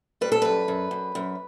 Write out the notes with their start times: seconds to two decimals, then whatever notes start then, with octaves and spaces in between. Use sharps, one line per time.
0.21 G3 B4
0.32 A4
0.42 F#2 B4
0.68 F#2
0.91 F#2
1.15 F#2